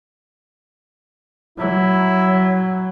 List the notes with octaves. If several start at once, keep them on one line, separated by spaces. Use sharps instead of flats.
F#3 E4